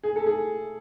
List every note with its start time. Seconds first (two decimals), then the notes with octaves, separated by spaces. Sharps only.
0.03 G#4
0.16 A4
0.26 G#4